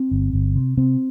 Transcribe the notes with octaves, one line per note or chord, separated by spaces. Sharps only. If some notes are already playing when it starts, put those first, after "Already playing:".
Already playing: C4
G1
G1
C3
C3 C4